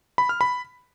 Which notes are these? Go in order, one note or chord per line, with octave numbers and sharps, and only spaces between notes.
B5
F6
B5